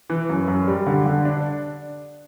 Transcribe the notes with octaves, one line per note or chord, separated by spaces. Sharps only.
E3
F#2
F#2
G3
D3
D3
D4